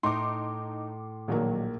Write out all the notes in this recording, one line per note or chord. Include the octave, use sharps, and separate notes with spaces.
A2 D#4 C6 D6
A#1 D#3 F#3 A#3